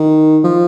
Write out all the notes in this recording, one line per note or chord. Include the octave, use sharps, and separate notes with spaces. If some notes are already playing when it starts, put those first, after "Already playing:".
Already playing: D#3
F3